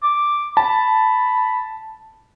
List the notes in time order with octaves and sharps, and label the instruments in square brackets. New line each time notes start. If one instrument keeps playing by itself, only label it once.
[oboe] D6
[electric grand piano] A5 [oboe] B5